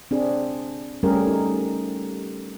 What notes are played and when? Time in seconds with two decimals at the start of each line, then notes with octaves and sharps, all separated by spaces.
0.11 C4 D4 G#4
1.03 G3 A3 C#4 G4 G#4 A#4
1.27 D#4